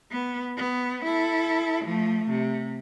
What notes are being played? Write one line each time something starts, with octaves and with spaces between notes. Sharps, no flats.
B3
B3
E4 A4
F3 A3
C3